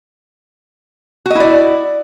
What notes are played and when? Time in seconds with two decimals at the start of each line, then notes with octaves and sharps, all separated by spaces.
1.26 F#4
1.30 D#5
1.35 E4
1.40 D5